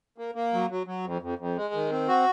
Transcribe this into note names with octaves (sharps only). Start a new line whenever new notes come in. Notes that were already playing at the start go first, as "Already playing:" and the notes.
A#3
A#3
F#3
F#3
F#3
F2
F2
F2
G#3
D#3
C4
F#4